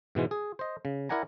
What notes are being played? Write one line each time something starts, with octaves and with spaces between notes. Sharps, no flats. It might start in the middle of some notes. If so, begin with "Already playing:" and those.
G#2 B2 E3 G#3
G#4
C5 D#5
C#3
E4 A#4 D5 F#5 G#5 A#5